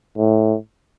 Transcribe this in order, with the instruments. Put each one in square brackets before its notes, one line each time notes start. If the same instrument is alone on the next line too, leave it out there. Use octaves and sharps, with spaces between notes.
[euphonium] A2